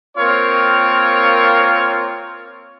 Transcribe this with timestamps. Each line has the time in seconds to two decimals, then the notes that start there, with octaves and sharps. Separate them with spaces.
0.17 A#3 C4 F4 A#4 C#5